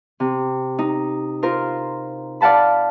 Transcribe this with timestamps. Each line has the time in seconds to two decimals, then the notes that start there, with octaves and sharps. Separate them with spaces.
0.20 C3
0.79 D#4
1.42 F4 A#4 C5
2.41 D5 F5 F#5 A5 B5